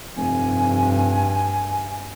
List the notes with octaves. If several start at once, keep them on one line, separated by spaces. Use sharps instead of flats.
F1 G2 G#5